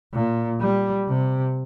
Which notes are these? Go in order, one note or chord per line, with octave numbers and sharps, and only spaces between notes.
A#2
G3
C3